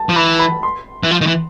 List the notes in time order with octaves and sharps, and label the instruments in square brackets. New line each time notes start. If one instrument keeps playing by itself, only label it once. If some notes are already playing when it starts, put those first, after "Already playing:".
Already playing: [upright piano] A5
[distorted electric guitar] F3
[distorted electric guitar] E3 [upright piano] B5
[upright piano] B5
C6
[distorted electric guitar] E3
F3
D#3
E3